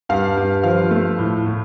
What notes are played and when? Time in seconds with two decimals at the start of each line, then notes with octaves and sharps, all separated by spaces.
0.09 G2 F5
0.37 G2
0.64 F3 F5
0.91 A3
1.19 A2
1.46 A2